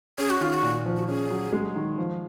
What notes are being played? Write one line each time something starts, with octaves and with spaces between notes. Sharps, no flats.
C#4 G#4
F#4
D#3 F4
F#4
A#2
F3
F#4
C#4 G#4
F#3
G#3
D#3
F3